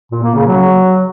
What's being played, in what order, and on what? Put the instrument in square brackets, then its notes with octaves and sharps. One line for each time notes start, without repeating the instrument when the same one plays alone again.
[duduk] A#2
A#3
C#3
F#3